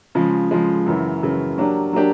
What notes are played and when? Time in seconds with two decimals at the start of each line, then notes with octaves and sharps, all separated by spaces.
0.15 C#3 F3 G#3
0.51 C#3 F3 G#3
0.86 F#2 C#3 E3
1.22 F#2 C#3 E3
1.58 F#3 A#3 D4 G4
1.93 F#3 A#3 D4 G4